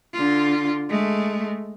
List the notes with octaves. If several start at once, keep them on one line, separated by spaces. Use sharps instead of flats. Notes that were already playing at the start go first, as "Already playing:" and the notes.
D3 F4
G#3 A3